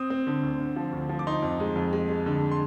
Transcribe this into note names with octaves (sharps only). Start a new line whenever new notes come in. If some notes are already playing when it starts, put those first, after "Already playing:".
Already playing: C4 D#6
C4
D3
D2
D2
F3
D2
F3
D6
D#4 C6
F2
G#3
F2
G#3
G#3
D3
C6